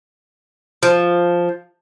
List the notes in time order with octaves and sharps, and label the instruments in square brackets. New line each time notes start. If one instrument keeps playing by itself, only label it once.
[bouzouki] F3